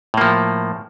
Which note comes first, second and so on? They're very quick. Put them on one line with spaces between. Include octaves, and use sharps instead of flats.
A2 A#3 F3